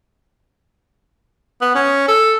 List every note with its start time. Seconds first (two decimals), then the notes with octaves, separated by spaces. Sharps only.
1.61 B3
1.75 C#4
2.08 A4